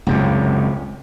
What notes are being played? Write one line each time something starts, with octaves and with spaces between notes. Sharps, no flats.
C#2 F#2 C3